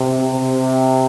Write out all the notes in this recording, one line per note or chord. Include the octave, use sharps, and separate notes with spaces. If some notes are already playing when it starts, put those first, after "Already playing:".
Already playing: C3
C3